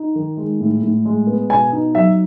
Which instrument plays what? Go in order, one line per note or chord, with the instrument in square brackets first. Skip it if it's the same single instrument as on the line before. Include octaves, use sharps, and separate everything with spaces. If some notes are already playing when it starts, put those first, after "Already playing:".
Already playing: [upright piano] D#4
D#3
G#3
A2
A2
G#3
B3
B2 G#5
D#4
F#3 E5